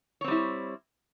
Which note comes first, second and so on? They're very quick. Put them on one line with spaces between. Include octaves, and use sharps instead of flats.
C#5 C4 G3 E4